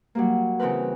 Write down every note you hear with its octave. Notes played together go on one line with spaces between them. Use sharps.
F#3 G3 A#3
C#3 E3 C4 A#4 B4